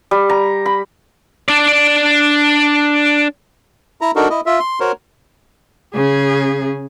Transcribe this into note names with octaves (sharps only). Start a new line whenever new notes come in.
G3
A#5
B5
D4 D5
E4 A#5
D4 D#4 F#4 A4 A#4
E4 D#5
F4 E5
C6
F#4 A#4 C5 C#5
C#3 G#4